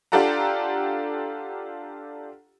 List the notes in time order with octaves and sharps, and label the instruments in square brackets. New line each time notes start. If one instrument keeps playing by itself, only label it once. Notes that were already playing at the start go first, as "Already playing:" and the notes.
[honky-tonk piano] D4 F4 G4 A4 F#5 A#5